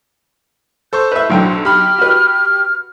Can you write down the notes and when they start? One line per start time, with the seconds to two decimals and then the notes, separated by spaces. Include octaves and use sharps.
0.93 A4 C5 C#6 G6
1.12 B4 E5
1.30 B1 D3 G5
1.65 G4 B5 F6
1.98 F#4 B4